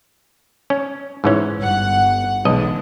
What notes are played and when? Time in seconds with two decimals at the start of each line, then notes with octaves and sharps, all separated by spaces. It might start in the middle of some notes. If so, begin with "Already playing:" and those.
0.70 C#4
1.24 G#2 E3 C#4
1.58 G1 F#5
2.45 B1 D3 E3 G#3 D#5